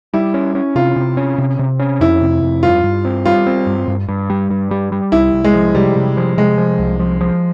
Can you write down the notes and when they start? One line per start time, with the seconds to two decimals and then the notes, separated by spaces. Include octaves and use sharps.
0.14 G3 E4
0.34 C#4
0.55 C#4
0.75 C3 F4
0.96 C3
1.17 C#4
1.38 C3
1.59 C3
1.79 C#4
2.00 F2 E4
2.21 C3
2.42 F2
2.63 G2 F4
2.84 G2
3.05 C4
3.25 G3 F4
3.46 C4
3.67 G2
3.88 G2
4.09 G2
4.30 G3
4.50 G2
4.71 G3
4.92 G3
5.12 C2 E4
5.33 C2
5.44 G#3
5.54 F3
5.75 C3 G3
5.96 C3
6.17 F3
6.37 C3 G#3
6.58 F3
6.79 C2
6.99 F3
7.21 F3